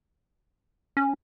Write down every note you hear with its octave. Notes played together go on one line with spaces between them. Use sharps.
C#4